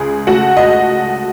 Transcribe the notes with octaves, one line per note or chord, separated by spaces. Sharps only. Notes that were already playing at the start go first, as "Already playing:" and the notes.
Already playing: C#2 G#4
A3 F#4 F#5
D#5